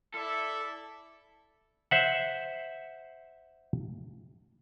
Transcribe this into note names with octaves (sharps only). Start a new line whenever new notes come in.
E4 A4 D5 E5
C5 E5 F#5